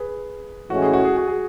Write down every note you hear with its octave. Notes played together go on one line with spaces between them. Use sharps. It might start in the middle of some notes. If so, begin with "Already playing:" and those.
Already playing: G#4 B4
A2 E3 G#3 C#4 F#4
G#4
F#4
G#4
F#4
G#4